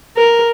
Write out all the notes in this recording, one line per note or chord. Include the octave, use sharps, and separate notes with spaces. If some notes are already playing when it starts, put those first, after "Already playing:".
A#4